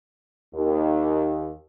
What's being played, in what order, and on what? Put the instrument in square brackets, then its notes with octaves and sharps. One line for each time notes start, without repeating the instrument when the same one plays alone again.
[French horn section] D#2